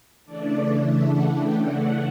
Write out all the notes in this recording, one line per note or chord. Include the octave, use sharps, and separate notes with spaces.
C#3 E3 A3 D4 D5
E5
F#5
G5
F#5